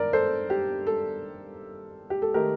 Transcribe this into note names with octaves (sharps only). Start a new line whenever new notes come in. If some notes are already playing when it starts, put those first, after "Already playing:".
Already playing: G2 D#3 A#4 D5
A4 C5
G4
A4
G4
A4
D#3 A3 D#4 G4 A#4